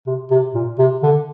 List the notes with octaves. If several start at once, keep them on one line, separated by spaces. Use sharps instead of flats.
C3
C3
A#2
C3
D3